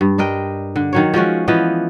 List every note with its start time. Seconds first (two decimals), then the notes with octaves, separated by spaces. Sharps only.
0.01 G2
0.18 D4 A#4 D#5 G5
0.76 D3
0.93 D#3 F#3 C#5
1.14 F3 G#3 C#4 F#4
1.48 E3 F3 B3 D#5